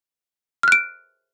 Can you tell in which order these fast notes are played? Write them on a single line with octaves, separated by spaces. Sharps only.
F6 F#6 D7